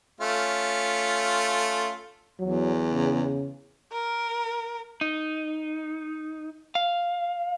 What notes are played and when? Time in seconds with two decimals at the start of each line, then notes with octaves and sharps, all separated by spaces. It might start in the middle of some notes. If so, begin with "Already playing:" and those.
0.21 A3 C#4 F4
2.39 E2 F#3
2.92 C#3
3.92 A#4
5.01 D#4
6.75 F5